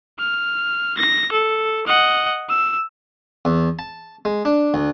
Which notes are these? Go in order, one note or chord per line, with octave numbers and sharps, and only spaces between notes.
F6
A#6
A4
D#5 F#5
E6
E2
A5
G#3
D4
D2